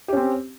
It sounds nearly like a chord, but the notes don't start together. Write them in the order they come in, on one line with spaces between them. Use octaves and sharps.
G4 C#4 C4